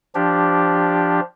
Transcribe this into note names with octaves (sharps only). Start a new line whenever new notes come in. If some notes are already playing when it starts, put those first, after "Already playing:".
F3 D4 G4